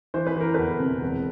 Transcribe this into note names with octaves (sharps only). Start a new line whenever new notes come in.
E3 C5
B4
E3 A#4
E2 A4 B4
C3
E1